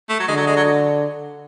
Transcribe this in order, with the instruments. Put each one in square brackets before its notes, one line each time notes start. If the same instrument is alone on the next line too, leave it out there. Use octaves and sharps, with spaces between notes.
[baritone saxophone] A3
F#3
[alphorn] D3 [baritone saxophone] G#3
[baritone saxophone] F#3
G#3
F#3